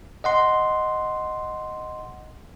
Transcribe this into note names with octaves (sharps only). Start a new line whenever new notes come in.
D#5 F#5 C6